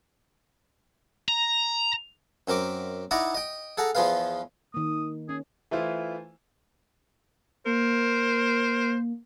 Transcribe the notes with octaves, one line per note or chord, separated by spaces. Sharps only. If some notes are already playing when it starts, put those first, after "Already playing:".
A#5
F#2 C4 A#4 D6
D#4 E4 D5 D#5 F#5 A#5
D#5 G5
G#4 A4 F#5 A#5
E2 F3 F4 G#4 B4 F5
D#3 A#3 D#6
C#4 G#4
E3 A3 E4 F4 C5
A#3 A#4 C5